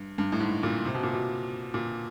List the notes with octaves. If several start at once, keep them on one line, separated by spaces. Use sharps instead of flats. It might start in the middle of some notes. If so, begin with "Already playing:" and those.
Already playing: G2
G2
A2
G#2
A#2
C3
B2
A#2
B2
A#2